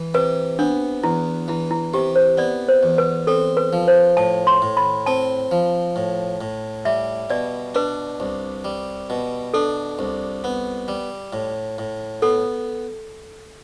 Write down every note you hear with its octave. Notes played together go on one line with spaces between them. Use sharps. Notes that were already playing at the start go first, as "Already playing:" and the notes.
Already playing: E3
C3 B4
B3 D4
E2 E4
E3 E4
E4
C3 G4
C5
B3 D5
C5
E2
B4
C4 A4
B4
F3
C5
A2 A5
C6
A2
B5
C4 A5
F3
A2
A2
G3 E5
B2 D5
D4 B4
C2
G3
B2
D4 A4
C2
B3
G3
A2
A2
B3 A4